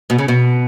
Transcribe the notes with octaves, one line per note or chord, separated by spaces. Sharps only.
B2
C#3
B2